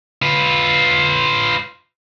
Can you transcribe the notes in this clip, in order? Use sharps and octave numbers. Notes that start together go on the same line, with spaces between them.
F4 B4